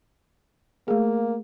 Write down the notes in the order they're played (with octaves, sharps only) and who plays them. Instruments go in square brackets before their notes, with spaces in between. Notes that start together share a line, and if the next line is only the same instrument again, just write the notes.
[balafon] A3 G#4 [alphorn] A#3